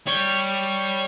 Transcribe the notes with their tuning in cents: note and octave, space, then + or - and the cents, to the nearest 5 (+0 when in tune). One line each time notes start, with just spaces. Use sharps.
G3 +0 C#5 +0